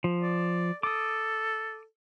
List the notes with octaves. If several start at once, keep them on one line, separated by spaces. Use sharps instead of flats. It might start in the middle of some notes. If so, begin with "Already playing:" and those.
F3
D5
A4 D6 D#6